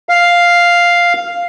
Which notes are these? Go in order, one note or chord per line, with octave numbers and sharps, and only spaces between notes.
F5